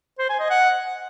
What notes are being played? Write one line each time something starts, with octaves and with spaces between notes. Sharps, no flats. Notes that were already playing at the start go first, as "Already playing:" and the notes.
C5
G#5
D#5
F#5